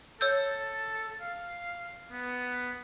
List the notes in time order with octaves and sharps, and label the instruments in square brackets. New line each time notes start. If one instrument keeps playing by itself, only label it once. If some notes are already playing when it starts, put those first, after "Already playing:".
[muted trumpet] A4 [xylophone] C#5 E6 G6
[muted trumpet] F5
B3